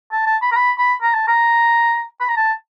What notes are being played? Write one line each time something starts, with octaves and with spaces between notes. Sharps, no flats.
A5
A5
B5
A#5
B5
B5
A#5
A5
A#5
B5
A#5
A5